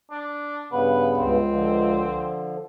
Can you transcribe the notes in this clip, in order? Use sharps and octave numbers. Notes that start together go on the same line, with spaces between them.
D4
G2 C#3 B3 B4
C#2 C4
D3 F3